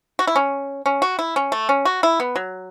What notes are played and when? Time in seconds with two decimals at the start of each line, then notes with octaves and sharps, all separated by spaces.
0.19 F#4
0.27 E4
0.36 C#4
0.86 C#4
1.02 F#4
1.19 E4
1.36 C#4
1.52 A3
1.69 C#4
1.85 F#4
2.03 E4
2.20 B3
2.36 F#3